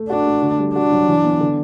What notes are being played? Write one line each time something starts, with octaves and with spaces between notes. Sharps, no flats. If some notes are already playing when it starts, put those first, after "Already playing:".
Already playing: A3
D4 F#4
A3
D3
G3
D4 F#4
F#3
E3
B3
D3